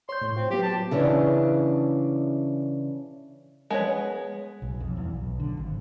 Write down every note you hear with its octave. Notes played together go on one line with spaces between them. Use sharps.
C#5 C6 G6
A2
C4 F4
F#3 B3 G4
A5
C#3 E3 C#4 D4
G#3 B3 C#5
B1
F2
E2
B1
D3
G#1